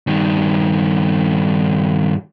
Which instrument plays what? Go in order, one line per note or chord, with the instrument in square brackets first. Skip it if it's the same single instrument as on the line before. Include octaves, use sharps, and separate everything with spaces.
[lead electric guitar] G2 D#3